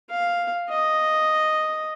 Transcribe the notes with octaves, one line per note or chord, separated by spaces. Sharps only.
F5
D#5